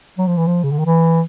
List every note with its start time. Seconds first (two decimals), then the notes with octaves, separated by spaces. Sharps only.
0.18 F#3
0.27 F3
0.37 E3
0.47 F3
0.64 C#3
0.71 D3
0.79 D#3
0.86 E3